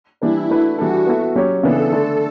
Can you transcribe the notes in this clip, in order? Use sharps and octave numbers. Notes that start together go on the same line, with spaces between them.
E3 G3 D4 E4 G4 B4
A3 D4 E4 F#4 B4
E3 G3 D4 F#4 A4
B3 E4 A4
F#3 C#4 G4 C#5
C#3 E3 B3 D4 A4
D3 A3 D4 A4